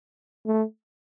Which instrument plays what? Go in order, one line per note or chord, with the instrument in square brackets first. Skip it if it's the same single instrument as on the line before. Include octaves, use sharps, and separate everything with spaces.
[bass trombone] A3